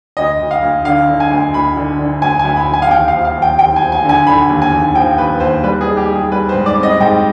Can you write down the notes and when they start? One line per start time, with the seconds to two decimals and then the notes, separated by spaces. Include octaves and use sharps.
0.17 D2 D#5
0.40 D2
0.51 F5
0.62 D2
0.85 D3 F5
1.08 D3
1.20 G#5
1.31 D2
1.54 D2 B5
1.77 D3
1.99 D3
2.21 D2 G#5
2.39 G#5
2.45 D2
2.56 B5
2.68 D2
2.74 G#5
2.82 F5
2.90 D#2 G5
3.08 F5
3.13 F3
3.25 F5
3.36 D#2
3.42 G5
3.58 D#2 G5
3.76 G#5
3.81 F3
3.92 G#5
4.05 D3 G#5
4.27 D3 B5
4.49 D#2
4.62 G#5
4.72 D#2
4.95 F3 G5
5.18 D#2 B4
5.40 D#2 C5
5.63 G3 B4
5.81 G#4
5.87 D#4
5.97 G4
6.09 G3
6.15 G#4
6.31 G3 B4
6.49 C5
6.54 G#2
6.66 D5
6.77 C4
6.83 D#5
7.00 G#2 G5